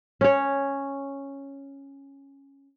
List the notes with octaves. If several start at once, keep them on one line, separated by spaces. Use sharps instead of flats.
C#4 C#5